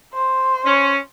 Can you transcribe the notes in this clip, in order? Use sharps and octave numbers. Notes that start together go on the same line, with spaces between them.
C5
C#4